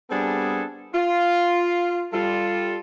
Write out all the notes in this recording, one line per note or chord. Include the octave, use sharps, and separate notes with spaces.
G3 B3 C4 D4 G#4 A4
F4
G3 F4 A4